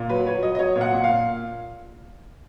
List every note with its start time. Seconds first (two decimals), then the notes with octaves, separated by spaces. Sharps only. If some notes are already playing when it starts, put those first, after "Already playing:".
Already playing: A#2
0.09 F#3 B4
0.26 F#3 C#5
0.43 F#3 D#5
0.55 D#5
0.59 F#3 C#5
0.76 A#2
0.81 F#5
0.93 A#2
1.04 F5
1.09 A#2